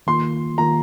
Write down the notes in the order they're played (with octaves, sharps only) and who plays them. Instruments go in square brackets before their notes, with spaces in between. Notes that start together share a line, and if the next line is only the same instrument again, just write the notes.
[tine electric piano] D#3 A#3 F4 [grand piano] C6
[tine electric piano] D#3 A#3 F4 [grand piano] A#5